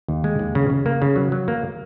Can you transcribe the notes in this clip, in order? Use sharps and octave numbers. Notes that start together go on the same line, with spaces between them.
D#2
G#3
D#2
C#3
C#3
A#3
C#3
F#3
F#3
A#3